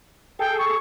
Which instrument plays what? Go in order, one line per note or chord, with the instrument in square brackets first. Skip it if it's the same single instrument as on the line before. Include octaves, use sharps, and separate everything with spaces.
[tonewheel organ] G#4 A4 [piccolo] G5
[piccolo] C#6